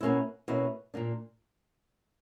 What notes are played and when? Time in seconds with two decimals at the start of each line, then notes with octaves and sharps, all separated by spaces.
0.01 B2 A#3 C#4 E4
0.48 B2 A#3 C#4 E4
0.94 A#2 A#3 D4